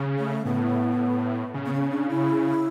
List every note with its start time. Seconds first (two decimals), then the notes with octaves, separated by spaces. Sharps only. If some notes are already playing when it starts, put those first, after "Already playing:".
Already playing: C#3
0.18 A3
0.45 A2 B3
1.54 C#3
1.66 B3
1.73 C#4
1.91 D4
2.09 E4